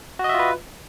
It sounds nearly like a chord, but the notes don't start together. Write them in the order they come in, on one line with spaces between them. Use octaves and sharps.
F#4 D#5 E5 F4 B4